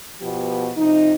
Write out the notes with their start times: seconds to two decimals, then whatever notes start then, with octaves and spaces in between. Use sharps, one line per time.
0.20 B2 F3 B3 G4
0.77 C3 F3 D#4